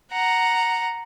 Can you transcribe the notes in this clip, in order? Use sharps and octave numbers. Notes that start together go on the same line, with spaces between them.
F#5 A#5